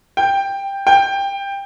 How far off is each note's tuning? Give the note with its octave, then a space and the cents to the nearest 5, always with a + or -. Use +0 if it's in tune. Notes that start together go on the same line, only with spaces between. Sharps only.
G5 +10
G5 +15